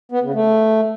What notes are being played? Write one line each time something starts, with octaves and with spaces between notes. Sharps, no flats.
B3
C#3
A3